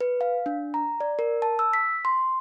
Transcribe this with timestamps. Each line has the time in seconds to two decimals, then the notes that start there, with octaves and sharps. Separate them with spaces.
0.01 B4
0.21 F5
0.46 D4
0.74 A#5
1.00 D5
1.19 A#4
1.42 A5
1.59 E6
1.73 B6
2.05 C6